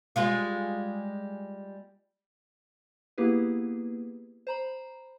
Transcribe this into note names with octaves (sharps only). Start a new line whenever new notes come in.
G3 G#3 F4
A#3 B3 E4 G4 G#4 B4
C5 A#5 B5